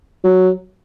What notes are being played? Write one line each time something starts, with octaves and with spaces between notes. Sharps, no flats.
F#3